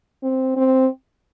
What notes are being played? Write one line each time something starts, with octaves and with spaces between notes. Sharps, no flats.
C4
C4